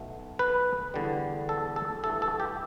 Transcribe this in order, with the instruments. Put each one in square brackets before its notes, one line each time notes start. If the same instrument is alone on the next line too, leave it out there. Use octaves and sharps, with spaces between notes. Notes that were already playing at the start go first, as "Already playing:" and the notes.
Already playing: [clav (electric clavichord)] B1 B2 A3
B4
E2 D3 G3
A4
A4
G2 E3 A3 A4
A4
G4